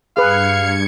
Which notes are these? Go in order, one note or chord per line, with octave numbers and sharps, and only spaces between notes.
G2 G#4 B4 F5 G#6 C#7